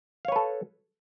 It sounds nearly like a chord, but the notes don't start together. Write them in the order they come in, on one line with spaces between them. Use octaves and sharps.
F5 C#5 B4 A4